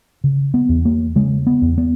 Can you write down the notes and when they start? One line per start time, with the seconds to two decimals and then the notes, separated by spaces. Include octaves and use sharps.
0.24 C#3
0.54 B3
0.69 E2
0.85 A#3
1.16 C#3 G#3
1.47 B3
1.62 E2
1.78 B3